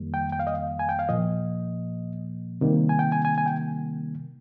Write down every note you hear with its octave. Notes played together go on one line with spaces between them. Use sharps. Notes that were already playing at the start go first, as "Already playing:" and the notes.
Already playing: F2 D#3 G3 A#3
G5
G5
F5
D#5
F5
G#5
G5
F5
A#2 F3 A#3 D#5
C3 D#3 G3 A#3
G#5
G5
G#5
G#5
G#5
G5